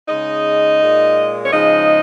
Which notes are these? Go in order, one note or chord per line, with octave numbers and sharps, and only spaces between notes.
C#3 G#3 D#4 D#5
A#2 G#3
C#5
C#3 F3 G#3 D#4 D#5